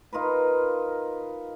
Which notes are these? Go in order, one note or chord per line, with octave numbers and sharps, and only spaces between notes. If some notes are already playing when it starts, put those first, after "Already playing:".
D#4 F4 A#4 B4